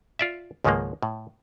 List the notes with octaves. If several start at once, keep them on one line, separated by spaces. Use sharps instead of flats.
F4 D5 E5
C#2 G#2 D#3 F3 G#3 A#3
A2